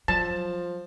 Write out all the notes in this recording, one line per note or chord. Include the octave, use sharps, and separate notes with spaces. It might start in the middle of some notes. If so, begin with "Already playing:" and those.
F3 F#3 A5